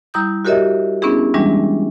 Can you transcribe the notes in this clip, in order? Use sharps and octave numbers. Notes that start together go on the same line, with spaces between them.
G3 E4 A#5 D#6 G6
F#4 G4 A#4 C#5 D#5 E5
B3 C#4 D4 E4 G#4
E3 G3 G#3 C#4 D4